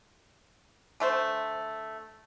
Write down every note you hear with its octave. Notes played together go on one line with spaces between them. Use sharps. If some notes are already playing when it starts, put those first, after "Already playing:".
D3 A3 C5